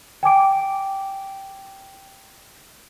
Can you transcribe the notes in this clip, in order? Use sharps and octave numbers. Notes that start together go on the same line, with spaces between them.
G5 G#5 D6 D7